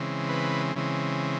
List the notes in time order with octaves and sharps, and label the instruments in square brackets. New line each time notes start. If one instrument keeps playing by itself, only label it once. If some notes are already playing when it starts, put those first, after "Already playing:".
Already playing: [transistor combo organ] C#3 E3 G#3 C4
B4
C#3 E3 G#3 C4